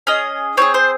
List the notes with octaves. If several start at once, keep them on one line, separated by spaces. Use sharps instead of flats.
C#4 G#4 D#5
C4 F4 G#4 C#5
C5